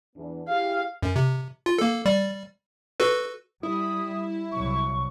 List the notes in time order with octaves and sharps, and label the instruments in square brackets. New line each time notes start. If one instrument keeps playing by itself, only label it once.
[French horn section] E2 B3 D4
[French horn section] E4 G4 G#4 [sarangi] F5
[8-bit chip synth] F#2
C3
F4
A#3 A4
G3 D5
F#4 A4 B4
[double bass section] G3 [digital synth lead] E4 [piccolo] D#6
[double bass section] C2 F#3 [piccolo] C#6